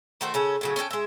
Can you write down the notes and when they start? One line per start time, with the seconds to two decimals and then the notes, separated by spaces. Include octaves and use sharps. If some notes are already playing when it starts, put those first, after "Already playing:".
0.21 D#3 A3 F#4 C5
0.34 C#3 C#4 A4
0.61 A2 C#3 F#3
0.76 C#4 A4 B4 G5
0.91 G#3 E5